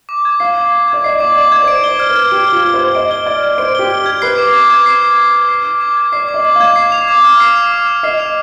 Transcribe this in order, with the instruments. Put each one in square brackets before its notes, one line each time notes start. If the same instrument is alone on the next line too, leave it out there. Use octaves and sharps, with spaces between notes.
[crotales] D6
G#6
[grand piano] F5 [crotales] C7
[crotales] D6
D6
G#6
[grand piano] D5
[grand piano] D#5 [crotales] C7
[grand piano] D5 [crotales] D6
[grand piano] D5 [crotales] D6
[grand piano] D5 [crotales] G#6
[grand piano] C5
[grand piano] D5 [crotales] D7
[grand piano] D5 [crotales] G7
[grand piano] C5
[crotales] F6
[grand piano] B4
[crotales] G#6
[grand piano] G4 [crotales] D7
[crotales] G7
[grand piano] F4
[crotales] F6
[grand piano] C5
[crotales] G#6
[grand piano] D#5 [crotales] D7
[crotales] G7
[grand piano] D5 [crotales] F6
[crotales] G#6
[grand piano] C5 [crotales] D7
[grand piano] G4 [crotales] G7
[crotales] F6
G#6
[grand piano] B4 [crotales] C7
[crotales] D6
D6
G#6
C7
D6
D6
G#6
C7
D6
D6
G#6
[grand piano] D5 [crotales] C7
[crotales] D6
[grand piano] D#5
[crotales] D6
[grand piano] F5
[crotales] G#6
C7
F7
D6
F6
C7
F7
D6
F6
[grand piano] D#5 [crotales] C7
[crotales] F7